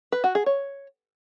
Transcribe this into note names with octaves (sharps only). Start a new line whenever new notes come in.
B4
F#4
G#4
C#5